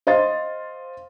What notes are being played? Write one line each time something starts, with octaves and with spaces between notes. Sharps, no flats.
C5 D#5 F5 C6 A6